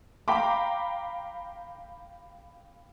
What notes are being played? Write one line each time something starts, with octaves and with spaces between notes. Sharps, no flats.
F5 G5 A#5 B5 D6